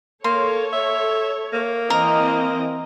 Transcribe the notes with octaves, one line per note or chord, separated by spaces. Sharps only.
A#3 A4 C#5 C6
E5
A#3
E3 C4 A#4 D#5